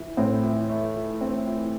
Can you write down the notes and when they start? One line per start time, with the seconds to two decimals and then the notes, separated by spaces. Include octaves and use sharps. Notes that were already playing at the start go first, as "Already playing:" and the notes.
Already playing: E3
0.17 A2 C4
0.43 E3
0.69 A3
0.96 E3
1.21 C4
1.47 E3